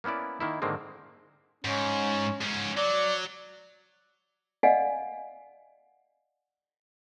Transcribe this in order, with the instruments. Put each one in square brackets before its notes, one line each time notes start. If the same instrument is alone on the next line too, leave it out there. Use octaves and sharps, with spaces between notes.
[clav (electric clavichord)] A#3 B3 C#4 E4 D5
D#3 A#3 E4
G#2 D3 D#3 G#3 A#3 C4
[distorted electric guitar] G#2 [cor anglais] C#4
[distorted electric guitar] G#2 C#4
[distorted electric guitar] F#3 [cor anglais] D5
[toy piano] D5 D#5 F5 F#5 G#5